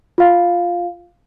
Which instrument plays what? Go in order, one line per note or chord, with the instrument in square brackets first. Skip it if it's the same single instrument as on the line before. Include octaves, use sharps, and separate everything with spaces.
[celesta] F4 F5